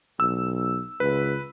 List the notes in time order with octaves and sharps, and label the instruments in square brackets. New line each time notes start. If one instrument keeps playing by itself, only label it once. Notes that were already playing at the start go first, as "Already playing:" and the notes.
[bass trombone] B1 [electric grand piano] E6
[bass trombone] C#2 [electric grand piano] B4